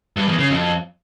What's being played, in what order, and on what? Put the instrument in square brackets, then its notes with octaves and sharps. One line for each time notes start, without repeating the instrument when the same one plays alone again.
[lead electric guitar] G2
E2
C#3
F2